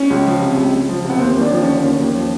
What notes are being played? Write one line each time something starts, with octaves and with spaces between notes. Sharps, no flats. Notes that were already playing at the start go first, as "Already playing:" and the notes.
Already playing: C#4
C#2
F3
C3
C#2
C#2
F3
C3 B3
D#2 C4
D#2 D4
F3
D3 C#4
D#2 C#4
D#2
F3